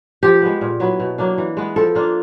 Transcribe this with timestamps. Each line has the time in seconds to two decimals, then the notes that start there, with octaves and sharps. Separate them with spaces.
0.23 F3 G4
0.42 G#3 B3
0.61 A#2
0.80 F#3 B3 E4
1.00 B2
1.18 F#3 A#3 D4
1.38 E3
1.57 G#3 B3
1.76 F3 A4
1.95 A#3 D4 F4